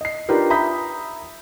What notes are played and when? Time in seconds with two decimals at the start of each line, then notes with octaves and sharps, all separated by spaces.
0.01 D#5 C7
0.29 D4 D#4 F4 G4 A#4 B4
0.50 E5 A#5 B5 D#6 G6 B6